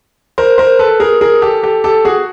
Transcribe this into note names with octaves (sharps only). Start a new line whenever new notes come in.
A#4 C5
A#4 C5
A4 B4
G#4 A#4
G#4 A#4
G4 A4
G4 A4
G4 A4
F#4 G#4